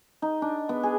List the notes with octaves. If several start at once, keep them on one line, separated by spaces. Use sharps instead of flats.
D#4
D4
B3
G#4